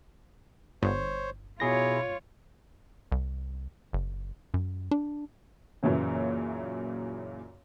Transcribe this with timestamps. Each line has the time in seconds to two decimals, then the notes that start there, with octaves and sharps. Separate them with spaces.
0.83 G1 C5 C#5
1.60 B2 E4 F4 G#4 C#5 A#6
3.12 C2
3.93 F#1
4.54 F#2
4.91 D4
5.83 F#2 A#2 C#3 E3 F#3